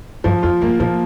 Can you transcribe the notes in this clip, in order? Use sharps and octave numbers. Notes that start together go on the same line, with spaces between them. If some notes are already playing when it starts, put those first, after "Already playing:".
G2 F3
F2 F4
G2 A#3
A#2 F3